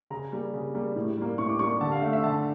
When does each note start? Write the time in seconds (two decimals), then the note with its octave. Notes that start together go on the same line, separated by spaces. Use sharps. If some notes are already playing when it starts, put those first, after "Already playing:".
0.10 C#3 A#5
0.32 G3 A#3
0.54 C#3
0.75 G3 A#3
0.96 A2
1.17 G3 A#3
1.38 A2 C#6
1.49 D6
1.59 G3 A#3 C#6
1.81 D3 A5
1.92 F5
2.02 A3 E5
2.13 E5
2.23 D3 A5